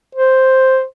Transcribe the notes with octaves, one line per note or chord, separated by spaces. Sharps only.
C5